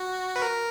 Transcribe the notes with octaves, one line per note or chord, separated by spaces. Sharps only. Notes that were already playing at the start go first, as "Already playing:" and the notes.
Already playing: F#4
B4
A#4